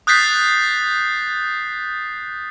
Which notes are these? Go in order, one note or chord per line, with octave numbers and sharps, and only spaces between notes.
D#6 F#6 G6 A6 B6 C7